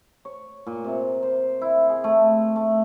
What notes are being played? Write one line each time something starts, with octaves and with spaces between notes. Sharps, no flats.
C#5
A#2
C3
C5
E4
G#4
A3
A3